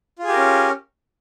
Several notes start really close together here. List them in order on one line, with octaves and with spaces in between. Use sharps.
F4 G#4 G4 A#4 C#4